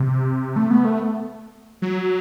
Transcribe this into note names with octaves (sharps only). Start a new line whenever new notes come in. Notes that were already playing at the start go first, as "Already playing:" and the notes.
Already playing: C3
A3
B3
A3
F#3